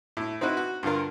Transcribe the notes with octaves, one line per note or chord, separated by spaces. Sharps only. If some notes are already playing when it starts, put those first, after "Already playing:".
A2
C4 D#4 E4 F#4 B4
F#4
G2 D3 F4 A#4